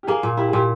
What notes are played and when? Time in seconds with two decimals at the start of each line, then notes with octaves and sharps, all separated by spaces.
0.03 G4
0.07 A#3 G#4
0.23 A#2
0.37 E4 G4
0.48 G#4
0.53 A#2 G4